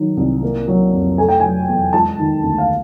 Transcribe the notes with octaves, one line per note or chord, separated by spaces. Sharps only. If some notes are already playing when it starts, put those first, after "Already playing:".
Already playing: D#3 F#3
C2
A#3
F#3
F2
A3 G#5
G5
F#3 G#5
E2
G#3 A5
D#3
D2
F5